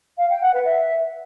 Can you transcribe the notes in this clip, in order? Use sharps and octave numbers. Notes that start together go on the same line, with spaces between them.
F5
G5
F#5
B4
E5